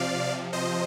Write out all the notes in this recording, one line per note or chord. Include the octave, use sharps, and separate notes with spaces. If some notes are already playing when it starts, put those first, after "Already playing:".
Already playing: C3 F3 D5 F5
C3 F3 C5 D#5